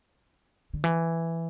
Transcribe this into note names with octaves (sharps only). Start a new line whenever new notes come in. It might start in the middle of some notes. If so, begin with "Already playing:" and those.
D3
E3